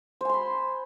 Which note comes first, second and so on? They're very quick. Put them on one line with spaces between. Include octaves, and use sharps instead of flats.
C5 G#5 C6 B5